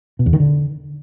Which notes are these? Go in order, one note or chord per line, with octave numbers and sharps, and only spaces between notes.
B2
E2
D#3
D3